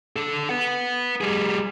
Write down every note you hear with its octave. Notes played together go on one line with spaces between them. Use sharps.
D3 A4
B4 F#5
G3 G#4